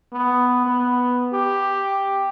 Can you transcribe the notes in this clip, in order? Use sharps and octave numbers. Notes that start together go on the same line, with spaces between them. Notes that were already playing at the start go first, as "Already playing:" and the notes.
B3
B3
G4